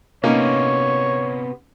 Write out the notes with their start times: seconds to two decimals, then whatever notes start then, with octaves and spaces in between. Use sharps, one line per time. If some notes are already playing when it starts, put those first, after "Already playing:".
0.24 C3 A#3 B3 C#4 D#4 C#5